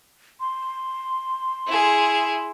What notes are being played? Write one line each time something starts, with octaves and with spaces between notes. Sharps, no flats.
C6
E4 G#4